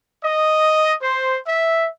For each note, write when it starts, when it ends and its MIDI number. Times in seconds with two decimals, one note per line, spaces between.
0.24 0.94 75
1.02 1.39 72
1.47 1.89 76